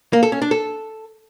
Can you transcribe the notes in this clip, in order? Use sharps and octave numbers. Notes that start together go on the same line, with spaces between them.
A#3
A4
C#4
D4
A4